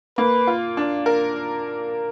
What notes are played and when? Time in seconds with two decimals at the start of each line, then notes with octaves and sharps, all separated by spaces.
0.18 A#3 B4
0.47 F4
0.77 D4
1.06 A#4